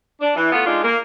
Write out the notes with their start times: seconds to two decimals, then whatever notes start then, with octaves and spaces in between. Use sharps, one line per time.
0.21 D4
0.36 E3
0.52 A3 B3 F4
0.66 G#3 D4 D#4 F4
0.84 A#3